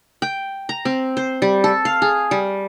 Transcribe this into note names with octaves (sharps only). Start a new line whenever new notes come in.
G5
A#5
C4
C5
G3
A4
F5
G#4
G3